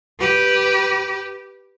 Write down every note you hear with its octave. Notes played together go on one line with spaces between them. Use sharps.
G4 B4